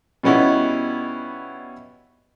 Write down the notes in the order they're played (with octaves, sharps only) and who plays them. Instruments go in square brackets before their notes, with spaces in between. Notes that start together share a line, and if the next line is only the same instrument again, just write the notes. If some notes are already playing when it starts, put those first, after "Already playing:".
[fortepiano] B2 G3 B3 C#4 D#4 E4